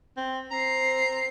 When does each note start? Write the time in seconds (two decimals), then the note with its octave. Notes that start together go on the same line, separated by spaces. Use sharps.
0.17 C4
0.51 C4 A#5 C7